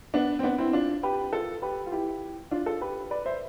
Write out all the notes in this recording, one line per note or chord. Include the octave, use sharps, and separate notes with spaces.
B3 D4
C4
B3 D4
C4 E4
D4 F4
G4 B4
F4 A4
G4 B4
F4
E4 G4
D4 F4
F4 A4
G4 B4
B4 D5
C5 E5